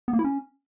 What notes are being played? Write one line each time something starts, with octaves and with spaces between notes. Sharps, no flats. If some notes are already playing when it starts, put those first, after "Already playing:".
B3
A#3
E4
C#4